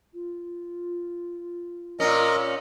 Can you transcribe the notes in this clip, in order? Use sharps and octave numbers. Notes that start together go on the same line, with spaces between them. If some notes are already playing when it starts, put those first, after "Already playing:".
F4
A#2 C#4 A#4 D#5